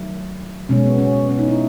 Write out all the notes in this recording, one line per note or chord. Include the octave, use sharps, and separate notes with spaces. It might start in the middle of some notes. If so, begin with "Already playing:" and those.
Already playing: D#3 F#3 A3
B2 G#3 C#4
B3
C#4
B3
C#4
D#4
E4